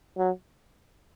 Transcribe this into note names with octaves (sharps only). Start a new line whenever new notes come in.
F#3